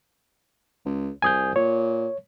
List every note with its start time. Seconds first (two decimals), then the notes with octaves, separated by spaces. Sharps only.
0.86 C#2
1.22 C2 G#5 D#6 G6
1.56 A#2 C#5